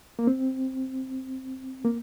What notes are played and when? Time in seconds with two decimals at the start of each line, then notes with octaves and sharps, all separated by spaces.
0.19 A#3
0.27 C4
1.84 A#3